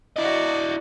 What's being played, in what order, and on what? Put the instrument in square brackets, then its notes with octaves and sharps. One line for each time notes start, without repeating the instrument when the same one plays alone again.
[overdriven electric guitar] E4 D#5 [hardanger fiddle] F#4 D5